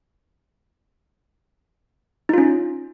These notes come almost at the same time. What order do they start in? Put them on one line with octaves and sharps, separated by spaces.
D#4 F4 C#4